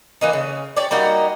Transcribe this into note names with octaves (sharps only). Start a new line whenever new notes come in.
E3 A#3 D#4
C#3
G4 C#5 D5
G3 A#3 D#4 F#4